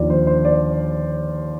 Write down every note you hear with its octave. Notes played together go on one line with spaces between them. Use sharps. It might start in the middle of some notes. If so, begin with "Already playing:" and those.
Already playing: D#2 D3 F3 D5
C5
C5
D5